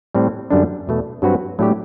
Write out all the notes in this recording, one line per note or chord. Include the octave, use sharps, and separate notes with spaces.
A2 G3 C4
F#2 D3 G3 D4
E2 B2 A3
G2 F#3 C4 F#4 B4
A2 F#3 A3 D4 G4